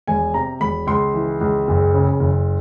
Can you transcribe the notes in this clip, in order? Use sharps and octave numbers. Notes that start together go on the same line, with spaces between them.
E1 G#5
C3 A#5
E1 B5
C#2 C6
E3
C#2
F#1
C#3
F#1